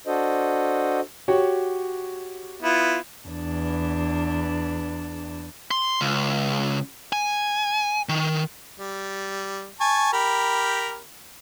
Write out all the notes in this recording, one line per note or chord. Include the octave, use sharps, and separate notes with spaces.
D4 F#4 A4 C5 D#5
F#4 G4 C#5
B3 E4 F4
E2 D4
C6
C#2
G#5
D#3
G3
G#5 A5 C#6
G4 A#4 B5